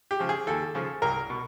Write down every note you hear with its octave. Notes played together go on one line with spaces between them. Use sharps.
G4
C#3 F3
G#4
D#2 A4
C#3 F3
C2 A#4
B2